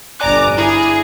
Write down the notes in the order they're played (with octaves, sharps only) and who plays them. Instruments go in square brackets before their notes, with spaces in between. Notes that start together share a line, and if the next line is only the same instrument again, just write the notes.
[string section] G1 A#5 D6 [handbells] D5 G#5 F#6
[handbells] E4 [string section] G#4